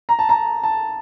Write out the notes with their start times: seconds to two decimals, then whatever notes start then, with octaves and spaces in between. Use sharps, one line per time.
0.09 A#5
0.19 A5
0.29 A#5
0.63 A5